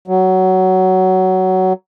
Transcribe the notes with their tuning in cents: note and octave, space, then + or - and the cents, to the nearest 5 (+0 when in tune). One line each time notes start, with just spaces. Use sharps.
F#3 +15